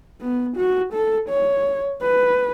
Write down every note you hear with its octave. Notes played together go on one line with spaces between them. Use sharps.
B3
F#4
A4
C#5
B4